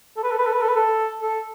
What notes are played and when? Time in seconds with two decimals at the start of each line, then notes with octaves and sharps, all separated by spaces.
0.17 A4
0.23 B4
0.31 A4
0.39 B4
0.46 A4
0.53 B4
0.62 A4
0.69 B4
0.76 A4
1.22 A4